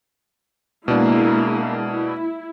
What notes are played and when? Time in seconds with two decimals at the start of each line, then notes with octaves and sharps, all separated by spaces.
0.88 B2 G#3 A#3 D4 E4
1.86 E4